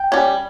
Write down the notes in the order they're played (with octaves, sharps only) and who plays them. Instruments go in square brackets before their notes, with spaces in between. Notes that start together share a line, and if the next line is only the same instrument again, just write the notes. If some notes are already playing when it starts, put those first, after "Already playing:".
Already playing: [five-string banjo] G5
G3 C#4